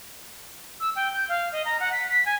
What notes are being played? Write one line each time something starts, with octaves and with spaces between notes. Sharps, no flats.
E6
G5
G6
F5
D#5
A#5
F#5
B6
B6
G#5